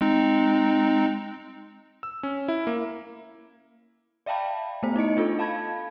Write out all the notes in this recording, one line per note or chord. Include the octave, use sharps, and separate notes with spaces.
G#3 C4 D#4
E6
C#4
E4
A#3
D5 E5 F5 G5 A5 B5
A3 B3 C5
D#4 E4 D#5 C#7
D4 F4 A4
F5 A5 B5 G#6